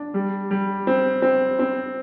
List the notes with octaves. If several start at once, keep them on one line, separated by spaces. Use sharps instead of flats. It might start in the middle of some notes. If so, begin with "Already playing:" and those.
Already playing: D4
G3
G3
C4
C4
C4